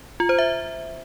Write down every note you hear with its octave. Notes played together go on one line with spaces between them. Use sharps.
F4
C5
E5